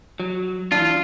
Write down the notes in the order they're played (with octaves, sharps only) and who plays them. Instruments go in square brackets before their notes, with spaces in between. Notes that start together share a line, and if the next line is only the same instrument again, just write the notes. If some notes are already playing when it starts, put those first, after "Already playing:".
[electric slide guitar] F#3
[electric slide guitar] E3 F#3 D4 [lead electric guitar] F4